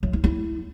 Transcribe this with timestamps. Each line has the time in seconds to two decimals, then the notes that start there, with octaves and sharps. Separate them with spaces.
0.03 F#3
0.13 E4
0.24 E4